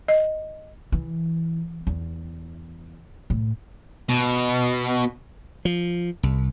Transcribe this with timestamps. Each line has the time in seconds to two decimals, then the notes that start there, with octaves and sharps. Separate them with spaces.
0.08 D#5
0.92 E3
1.87 E2
3.30 A2
4.09 B2
5.65 F3
6.23 C2